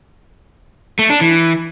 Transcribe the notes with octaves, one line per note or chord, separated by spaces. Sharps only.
A3
D4
E3